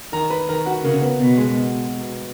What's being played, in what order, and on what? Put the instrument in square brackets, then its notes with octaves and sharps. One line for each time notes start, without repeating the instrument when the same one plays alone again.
[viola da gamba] D#3 [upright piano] A#4 A#5
[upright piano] B4 B5
[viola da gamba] D#3 [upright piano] A#4 A#5
[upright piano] F#4 F#5
[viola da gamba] C#3 [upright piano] A#3 A#4
[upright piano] B3 B4
[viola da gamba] B2
[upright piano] G#3 G#4